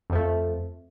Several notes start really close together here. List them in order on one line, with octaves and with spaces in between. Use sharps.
F2 F3 A3